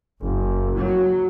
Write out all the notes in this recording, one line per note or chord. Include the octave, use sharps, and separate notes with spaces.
F#1
F#3